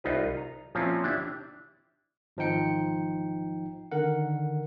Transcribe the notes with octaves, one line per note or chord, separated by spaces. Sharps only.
C2 D#4 F4 B4
A#5
A#2 F3 C4 C#4 E4 F4
D4 E4 G4
G#1 F3 D#4 G5 C#7
D3 D#3 A#4 F#5